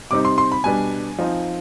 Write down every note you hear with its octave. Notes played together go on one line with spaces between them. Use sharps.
C3 G3 C4 D#4 D6
C6
C6
B5
B2 G3 B3 D4 G#5
F3 C4 D#4